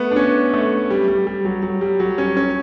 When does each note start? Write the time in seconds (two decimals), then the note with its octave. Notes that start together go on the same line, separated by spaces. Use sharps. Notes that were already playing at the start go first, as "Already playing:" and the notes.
Already playing: A3 B3
0.11 D4
0.16 C#4
0.54 A3
0.90 G3
1.08 G3
1.27 G3
1.45 F#3
1.62 F#3
1.81 G3
2.00 F#3
2.18 C#4
2.37 C#4